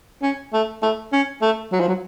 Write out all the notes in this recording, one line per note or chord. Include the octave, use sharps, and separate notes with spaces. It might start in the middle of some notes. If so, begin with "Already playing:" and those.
C#4
A3
A3
C#4
A3
F#3
F3
F#3